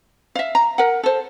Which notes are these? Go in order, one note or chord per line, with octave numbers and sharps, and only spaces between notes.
E5 F5
A#5
A#4 F#5
A4 C5